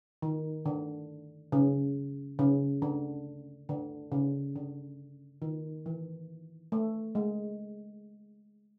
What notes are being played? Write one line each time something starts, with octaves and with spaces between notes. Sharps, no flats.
D#3
D3
C#3
C#3
D3
D3
C#3
D3
D#3
E3
A3
G#3